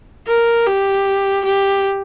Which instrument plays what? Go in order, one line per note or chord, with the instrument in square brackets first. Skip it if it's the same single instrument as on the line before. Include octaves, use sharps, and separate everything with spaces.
[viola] A#4
G4
G4